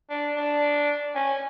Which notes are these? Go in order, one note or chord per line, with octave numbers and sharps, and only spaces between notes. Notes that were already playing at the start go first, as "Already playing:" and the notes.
D4
D4
C#4